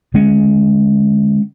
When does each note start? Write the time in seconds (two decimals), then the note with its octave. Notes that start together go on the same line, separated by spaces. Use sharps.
0.14 D3 G#3 C#4